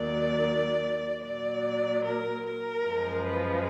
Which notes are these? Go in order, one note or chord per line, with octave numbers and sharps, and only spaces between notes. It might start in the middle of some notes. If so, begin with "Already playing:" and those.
Already playing: D#2 D#3 F#3 D5
A#2 F#3 D5
A#4
A#4
F#2 F3 G#3
B4